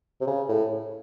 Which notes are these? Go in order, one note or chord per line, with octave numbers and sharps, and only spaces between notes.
C3
C#3
A2